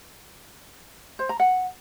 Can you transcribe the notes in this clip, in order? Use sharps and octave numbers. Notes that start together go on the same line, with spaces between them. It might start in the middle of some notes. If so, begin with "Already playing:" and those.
C5
A#5
F#5